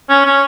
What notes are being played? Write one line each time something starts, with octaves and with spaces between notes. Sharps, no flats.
C#4
C#4